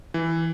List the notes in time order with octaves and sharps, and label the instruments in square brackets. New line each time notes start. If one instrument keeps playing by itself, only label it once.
[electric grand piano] E3